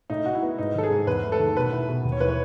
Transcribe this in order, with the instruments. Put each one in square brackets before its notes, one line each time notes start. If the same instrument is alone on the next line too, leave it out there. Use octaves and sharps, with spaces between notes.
[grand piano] A2 [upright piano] D#4
[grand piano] A2 [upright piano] F#4
[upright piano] E4
[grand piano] B3
[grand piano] G#2 [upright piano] D#4
[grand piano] D#3 [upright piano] A4
[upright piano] G#4
[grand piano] G#2
[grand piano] E2 [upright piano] B4
[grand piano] A3
[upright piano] A4
[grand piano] D#3
[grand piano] B2 [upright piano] B4
[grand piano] E4
B2
D#2
[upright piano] C#5
[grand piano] E3 [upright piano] B4
[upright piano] C#5